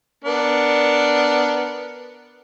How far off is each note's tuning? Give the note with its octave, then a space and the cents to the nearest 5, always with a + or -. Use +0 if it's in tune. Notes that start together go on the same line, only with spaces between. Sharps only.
B3 +0 D4 +0 A#4 +0